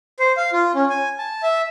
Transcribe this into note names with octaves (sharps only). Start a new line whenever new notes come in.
C5
F5
F4
C#4
G#5
A5
E5